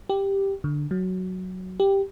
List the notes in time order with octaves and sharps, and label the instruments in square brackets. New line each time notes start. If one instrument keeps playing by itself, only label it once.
[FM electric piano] G4
D3
F#3
G4